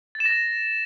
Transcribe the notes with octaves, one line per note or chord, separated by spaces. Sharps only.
A6
E7
A#6